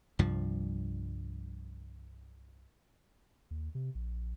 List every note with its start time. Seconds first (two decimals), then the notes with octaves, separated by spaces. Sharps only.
0.19 C2 G2 F3
3.51 D#2
3.75 C3
3.95 A#1